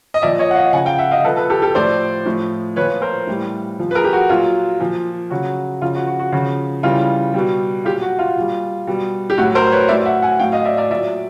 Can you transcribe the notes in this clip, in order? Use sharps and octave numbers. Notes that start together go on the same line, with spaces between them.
D#5
A#2 F3 D5 E5
C#5 D#5
F#5
D#5 F5
C#3 F3 F#5 G#5
F5 G5
E5 F#5
D#5 F5
A#2 F3 A4 B4
A4 B4
G4 A4
G4 A4
A2 F3 C5 D5
A2 F3
A#2 F3 B4 C#5
A#4 C5
A2 E3 G3
A#2 F3
B4
G#4 A#4
G4
F#4
A#2 F#3 F4
A#2 F3
C#3 F#3 F#4
C#3 F3 F4
F#4
F#4
F#4
C#3 F3
C#3 E3 G3 F4
B2 G3
A#2 F#3 F4 G4
F#4
F4
A#2 G3
B2 G3
G4
A2 F#3 F#4
A#4 C5
B4 C#5
A2 F#3 D5 E5
E5 F#5
F#5 G#5
A2 F#3 F5 G5
D#5 F5
D5 E5
D5 E5
A#2 F#3 D5 E5